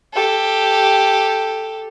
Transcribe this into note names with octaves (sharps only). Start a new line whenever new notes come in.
G4 A4